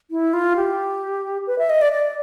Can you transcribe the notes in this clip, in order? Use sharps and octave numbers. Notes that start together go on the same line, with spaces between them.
E4
F4
G4
B4
E5
D#5
D5
D5